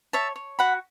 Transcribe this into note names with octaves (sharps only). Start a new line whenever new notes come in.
C#5 E5 A5
C#5
F#4 F#5 B5